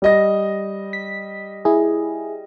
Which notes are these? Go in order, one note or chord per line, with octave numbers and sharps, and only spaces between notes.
G3 D#5 A#6
B6
E4 G#4